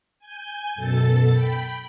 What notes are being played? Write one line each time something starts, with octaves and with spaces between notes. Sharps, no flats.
G#5 G6
F#2 B2 A4 A6
G5 B5